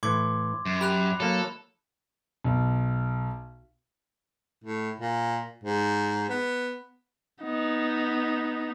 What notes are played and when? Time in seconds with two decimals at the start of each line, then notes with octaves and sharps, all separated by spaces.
0.03 A2 E3 C6 D6 G#6
0.66 F#2
0.81 G4 B5 F#6 F7
1.20 F#3 A#3 A4
2.45 B1
4.64 A2
5.00 A#2
5.64 G#2
6.29 B3
7.43 B3 D#4